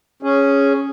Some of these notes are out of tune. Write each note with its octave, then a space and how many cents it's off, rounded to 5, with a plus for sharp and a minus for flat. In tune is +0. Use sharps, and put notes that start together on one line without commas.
C#4 +0 G#4 +0